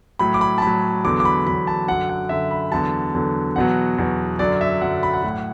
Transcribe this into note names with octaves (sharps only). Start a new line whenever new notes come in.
A2 F#3 B5
D6
B5
A5
A2 B5
F#3
E2 D3 F#3 D6
D6
B5
E2 D3 F#3 B5
A5
F#2 D3 F#3 F#5
F#5
F#2 D3 F#3 E5
B5
E2 D3 F#3 A5
E2 D3 F#3
E2 B2 F#3 F#5
E2 B2 F#3
F#2 D3 F#3 D5
E5
F#2 D3 F#3 F#5
B5
F#5
A2 F#3